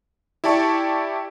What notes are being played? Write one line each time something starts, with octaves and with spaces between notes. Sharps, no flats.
E4 G4 D5 A5 C#6